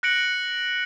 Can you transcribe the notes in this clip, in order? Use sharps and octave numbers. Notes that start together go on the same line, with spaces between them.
F#6 A#6 C#7 D7 F#7